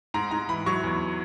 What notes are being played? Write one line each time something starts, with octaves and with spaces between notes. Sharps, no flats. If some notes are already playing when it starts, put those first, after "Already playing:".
G#2 A#5
G#2 A#5
E3 B5
F#3 C#6
E2